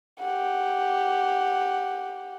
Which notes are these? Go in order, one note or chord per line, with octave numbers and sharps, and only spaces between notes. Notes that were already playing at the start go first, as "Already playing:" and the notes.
G4 F#5